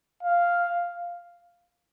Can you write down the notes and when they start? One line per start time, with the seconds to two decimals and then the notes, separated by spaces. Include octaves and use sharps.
0.23 F5